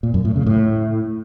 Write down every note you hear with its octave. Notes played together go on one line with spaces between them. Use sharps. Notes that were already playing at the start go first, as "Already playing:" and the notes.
A#2
F#2
A2
C#3
A2